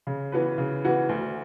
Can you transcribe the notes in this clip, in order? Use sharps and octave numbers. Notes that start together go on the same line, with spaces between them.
C#3
E3 B3 F#4 B4
C#3
E3 B3 F#4 B4
D2